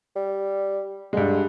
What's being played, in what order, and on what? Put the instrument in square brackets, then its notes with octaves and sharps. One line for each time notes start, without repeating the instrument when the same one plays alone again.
[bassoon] G3
[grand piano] G2 G#3 [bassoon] D3